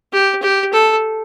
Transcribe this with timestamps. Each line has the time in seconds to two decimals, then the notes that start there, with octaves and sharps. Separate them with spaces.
0.13 G4
0.42 G4
0.73 A4